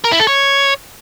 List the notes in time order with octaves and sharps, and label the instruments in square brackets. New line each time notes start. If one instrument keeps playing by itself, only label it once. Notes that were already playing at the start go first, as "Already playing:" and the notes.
[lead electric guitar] A#4
E4
A4
C#5